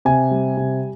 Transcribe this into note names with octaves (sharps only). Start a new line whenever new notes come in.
C3 G#5
G3
C3